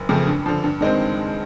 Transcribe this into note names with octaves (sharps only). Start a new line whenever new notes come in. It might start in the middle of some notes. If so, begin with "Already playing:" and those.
Already playing: F#1
F2 C#3 F3 A3
G2
D3 F3
G2
D#3 G#3 C4